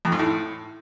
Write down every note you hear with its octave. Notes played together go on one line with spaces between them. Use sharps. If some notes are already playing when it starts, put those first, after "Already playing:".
F2
G#2
A2